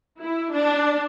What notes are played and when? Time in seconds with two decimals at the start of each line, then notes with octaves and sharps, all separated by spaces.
0.20 E4
0.52 D4